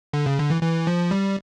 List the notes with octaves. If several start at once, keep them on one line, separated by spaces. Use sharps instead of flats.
D3
C#3
D3
E3
E3
F3
G3